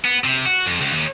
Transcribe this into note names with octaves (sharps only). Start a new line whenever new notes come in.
B3
C3
F#4
F2
C#2
D#2